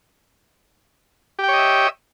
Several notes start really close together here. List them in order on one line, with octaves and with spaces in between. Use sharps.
G4 G5 C#5 D#5 E5